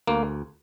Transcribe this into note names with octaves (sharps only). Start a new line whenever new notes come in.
D2 A#3